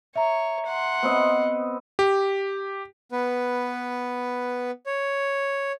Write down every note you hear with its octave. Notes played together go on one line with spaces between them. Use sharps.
C#5 E5 A#5
F#5 C6
B3 C4 D#5
G4
B3 B4
C#5